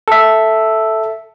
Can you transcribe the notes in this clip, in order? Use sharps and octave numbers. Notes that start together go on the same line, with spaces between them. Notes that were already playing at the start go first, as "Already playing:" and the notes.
A4 E5